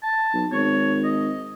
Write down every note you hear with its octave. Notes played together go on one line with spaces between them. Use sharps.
A5
B1
G#1 C#5
D#5